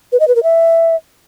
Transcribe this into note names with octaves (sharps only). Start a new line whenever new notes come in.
B4
D#5
B4
A#4
E5